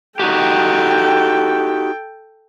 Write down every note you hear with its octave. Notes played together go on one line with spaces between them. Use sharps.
D#4 F#4 G4 A4 G5